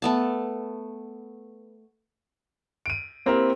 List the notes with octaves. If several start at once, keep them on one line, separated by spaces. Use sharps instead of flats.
A3 B3 A5
D7 D#7
A#3 C4 E4 G4 A#4